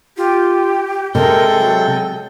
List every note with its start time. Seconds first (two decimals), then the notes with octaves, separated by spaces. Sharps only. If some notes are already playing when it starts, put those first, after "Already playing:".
0.17 F4 G4
1.15 C3 G#3 A4 A#4 G5
1.59 F#3